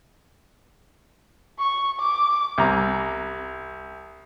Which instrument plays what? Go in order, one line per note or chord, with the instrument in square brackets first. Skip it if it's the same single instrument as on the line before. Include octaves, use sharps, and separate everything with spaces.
[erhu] C#6
D6
[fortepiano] C2 A#5